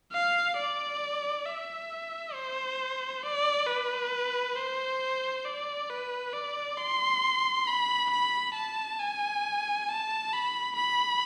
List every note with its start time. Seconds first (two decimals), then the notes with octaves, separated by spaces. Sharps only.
0.13 F5
0.57 D5
1.46 E5
2.34 C5
3.23 D5
3.67 B4
4.56 C5
5.45 D5
5.90 B4
6.33 D5
6.78 C6
7.67 B5
8.11 B5
8.55 A5
8.99 G#5
9.89 A5
10.33 B5
10.77 B5